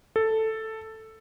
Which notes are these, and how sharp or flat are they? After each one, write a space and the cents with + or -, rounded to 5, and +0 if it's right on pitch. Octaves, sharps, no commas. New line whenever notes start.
A4 +5